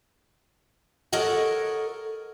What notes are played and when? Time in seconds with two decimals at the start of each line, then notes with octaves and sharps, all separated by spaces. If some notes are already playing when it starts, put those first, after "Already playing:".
1.12 A4 A#4 C#5 D#5 F#5